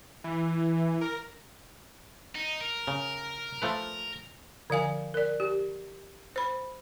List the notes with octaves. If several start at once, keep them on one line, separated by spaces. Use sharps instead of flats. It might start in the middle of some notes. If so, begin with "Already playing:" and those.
E3
A#4
D#4
A#4
C#3
F3 A3 B4
D3 F3 F5 G#5
A#4 D5
G4
C5 B5